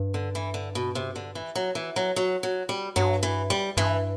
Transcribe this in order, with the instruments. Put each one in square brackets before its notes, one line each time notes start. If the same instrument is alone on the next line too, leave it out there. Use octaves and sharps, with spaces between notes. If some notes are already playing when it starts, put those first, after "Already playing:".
Already playing: [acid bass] G2
[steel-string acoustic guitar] D3
E3
D3
B2
C3
D3
E3
F#3
E3
F#3
F#3
F#3
G3
[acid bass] G2 [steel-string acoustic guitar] F#3
[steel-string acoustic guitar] E3
G3
[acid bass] G2 [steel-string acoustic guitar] E3